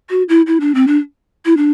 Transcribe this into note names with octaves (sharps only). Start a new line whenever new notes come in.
F#4
E4
E4
D4
C4
D4
E4
D4